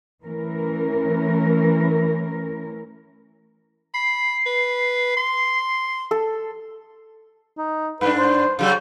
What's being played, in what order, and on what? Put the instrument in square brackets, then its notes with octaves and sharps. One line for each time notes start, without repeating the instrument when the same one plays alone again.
[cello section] E3 A3 C#4 A#4
[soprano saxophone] B5 [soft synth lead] C7
[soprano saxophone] B4
C6
[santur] A4
[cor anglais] D#4
[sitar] G2 D4 [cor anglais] B4
[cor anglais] C5
[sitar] C#3 F#3 G3